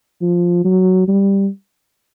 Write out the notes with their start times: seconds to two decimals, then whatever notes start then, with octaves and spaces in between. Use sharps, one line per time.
0.21 F3
0.65 F#3
1.08 G3